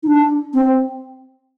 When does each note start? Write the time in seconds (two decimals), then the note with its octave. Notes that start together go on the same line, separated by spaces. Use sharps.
0.03 D#4
0.07 D4
0.54 C4